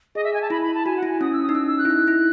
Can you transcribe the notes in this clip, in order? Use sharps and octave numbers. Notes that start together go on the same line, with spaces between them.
G#4 D#5
E5
G#5
A5
E4 B5
B5
A5
F#4 G#5
F#5
E4
G#5
C#4 D#6
E6
D#6
D#4
C#4 E6
E6
F#6
E4
D#4
E4